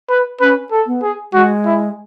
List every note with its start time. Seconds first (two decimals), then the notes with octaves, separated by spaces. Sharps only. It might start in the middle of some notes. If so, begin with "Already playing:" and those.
0.09 B4
0.41 C#4 B4
0.71 A4
0.86 B3
1.03 G#4
1.33 G#3 F#4
1.65 E4